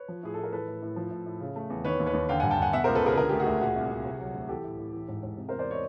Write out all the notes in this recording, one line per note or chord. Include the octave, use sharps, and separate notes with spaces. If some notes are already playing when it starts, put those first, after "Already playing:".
Already playing: B4 C#5
F3
A2 G#4
A4
A2
A#4
E3 A4 B4
A2
A2
F3
A2
A2
C#3
A3
E2
D#3 B4 C#5
D#2
B4 C#5
D#2
D3 F5 G5
F#5 G#5
G2
G5 A5
G2 F#5 G#5
B2 E5 F#5
C#2 A#4 C5
A4 B4
C#2 G#4 A#4
B4
D3 G#4 A#4
A3 G4
F#4 G#4
D2
A#2 F#4 G#4
C2
C2
C3
F#3
D2
E3 G4 A4
A2
A2
E3
G#2
G#2
C3
A#4 C5
E2
C5 D5
C#5 D#5